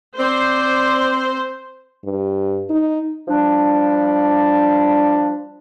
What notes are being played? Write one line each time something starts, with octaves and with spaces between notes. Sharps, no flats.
C4 C5 D5
G2
D#4
F3 G3 D4